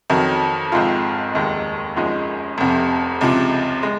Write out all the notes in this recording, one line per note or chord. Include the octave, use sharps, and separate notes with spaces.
F2 D#3 F#3
G#1 G#2 F3 C4 F4
F1 D#2 D#3 G#3
G#1 F#2 F3 G#3 D#4
F1 F2 C3
C#2 C3 F3
G#3